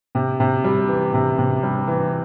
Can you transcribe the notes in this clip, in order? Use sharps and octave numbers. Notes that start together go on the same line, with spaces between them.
C3
C3
G3
E3
C3
C3
G3
E3